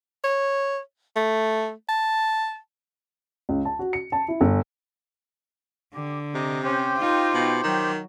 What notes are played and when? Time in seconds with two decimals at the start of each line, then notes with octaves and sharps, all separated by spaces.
0.24 C#5
1.16 A3
1.89 A5
3.49 C#2
3.65 A5
3.79 F#4
3.93 C#7
4.12 A5
4.28 E4
4.41 G1
5.94 D3 G4
6.35 C3 D#5 A#5 D6
6.64 C#4 G4 C5 G5
6.98 D#4 F4
7.34 B2
7.64 D#3 F#3